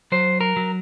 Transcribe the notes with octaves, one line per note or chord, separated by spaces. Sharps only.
F#3 C5
A#4
F#3